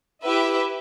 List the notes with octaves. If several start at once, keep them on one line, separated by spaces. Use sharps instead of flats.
E4 G4 B4 E5